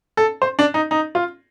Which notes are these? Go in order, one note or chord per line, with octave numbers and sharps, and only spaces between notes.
A4
C5
D4
D#4
D#4
F4